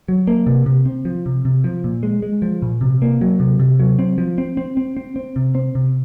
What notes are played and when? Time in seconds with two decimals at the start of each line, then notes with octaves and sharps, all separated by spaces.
0.08 F#3
0.27 A#3
0.47 C3
0.66 C3
0.86 C4
1.05 F3
1.26 C3
1.45 C3
1.64 F3
1.84 A#2
2.03 G#3
2.22 G#3
2.42 F3
2.62 A#2
2.81 C3
3.02 A#3
3.21 F#3
3.40 C3
3.60 C3
3.79 F#3
3.99 C4
4.18 F3
4.38 C4
4.57 C4
4.77 C4
4.97 C4
5.16 C4
5.36 C3
5.55 C4
5.75 C3